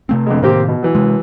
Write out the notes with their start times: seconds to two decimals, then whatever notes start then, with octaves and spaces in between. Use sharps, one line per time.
0.09 C3 A3 C4
0.26 F2 D3 G#3
0.43 A2 C3 D#3 A#3 C4 G4
0.68 B2
0.83 E3 F#3
0.95 C3 G#3